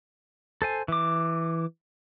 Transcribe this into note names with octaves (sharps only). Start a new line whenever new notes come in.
A4 C5 G#5
E3 D6